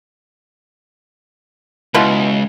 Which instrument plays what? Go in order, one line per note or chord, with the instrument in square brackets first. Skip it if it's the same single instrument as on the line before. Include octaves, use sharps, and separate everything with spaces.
[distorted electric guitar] C#2 [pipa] B2 E4 F4